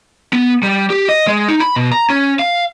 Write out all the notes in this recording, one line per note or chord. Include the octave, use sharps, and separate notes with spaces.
B3
G3
G4
D#5
G#3
D#4
B5
B2
A#5
C#4
F5